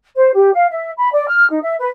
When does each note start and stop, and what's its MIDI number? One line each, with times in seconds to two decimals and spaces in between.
0.17 0.29 72
0.34 0.53 67
0.53 0.66 77
0.71 0.91 76
0.97 1.10 83
1.13 1.26 74
1.28 1.45 89
1.50 1.59 63
1.63 1.74 76
1.80 1.89 71